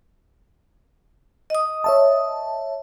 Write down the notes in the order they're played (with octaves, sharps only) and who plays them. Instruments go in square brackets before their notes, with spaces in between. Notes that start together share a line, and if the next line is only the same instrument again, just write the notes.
[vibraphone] D#5 D#6
[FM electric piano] C#5 E5 A5